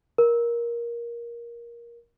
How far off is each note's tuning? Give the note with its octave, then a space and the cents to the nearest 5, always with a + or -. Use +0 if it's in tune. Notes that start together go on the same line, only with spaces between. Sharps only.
A#4 +15